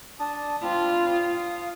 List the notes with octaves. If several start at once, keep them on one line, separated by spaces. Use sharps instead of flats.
D4 A5 D#6
C4 D4 F4 B5
F5 D#6